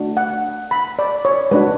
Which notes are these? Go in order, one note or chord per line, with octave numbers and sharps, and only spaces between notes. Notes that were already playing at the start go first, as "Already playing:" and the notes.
Already playing: A3 D4 F#4
F#5
B5
D5
C#5
G#3 D4 F#4 B4